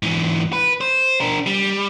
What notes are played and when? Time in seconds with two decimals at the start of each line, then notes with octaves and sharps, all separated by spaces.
0.02 G#2 E3
0.53 B4
0.81 C5
1.21 D4 A#4
1.47 G3